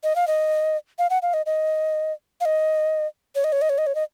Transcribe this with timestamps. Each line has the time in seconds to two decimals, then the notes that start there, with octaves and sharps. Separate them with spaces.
0.04 D#5
0.16 F5
0.27 D#5
0.99 F5
1.10 F#5
1.22 F5
1.34 D#5
1.46 D#5
2.41 F5
2.45 D#5
3.35 C#5
3.44 D#5
3.52 C#5
3.62 D#5
3.70 C#5
3.78 D#5
3.87 C#5
3.95 D#5